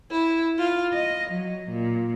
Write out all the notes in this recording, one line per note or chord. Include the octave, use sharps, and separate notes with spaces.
E4
F4
D#5
F#3
A#2